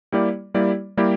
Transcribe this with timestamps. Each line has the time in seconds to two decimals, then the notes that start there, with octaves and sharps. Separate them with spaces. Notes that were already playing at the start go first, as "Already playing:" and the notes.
0.12 G3 A#3 E4 G4 D5
0.54 G3 A#3 E4 G4 D5
0.97 G3 A#3 E4 G4 D5